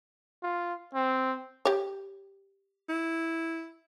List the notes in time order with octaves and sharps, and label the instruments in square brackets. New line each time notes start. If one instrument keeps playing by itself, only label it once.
[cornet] F4
C4
[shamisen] G4 C#5
[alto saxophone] E4